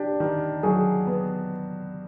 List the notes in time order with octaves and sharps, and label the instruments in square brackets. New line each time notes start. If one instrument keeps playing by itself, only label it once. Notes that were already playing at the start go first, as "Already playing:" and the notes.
Already playing: [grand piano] D4 [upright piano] G4
[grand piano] D#3
[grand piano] F#3 [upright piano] G#4
[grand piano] B3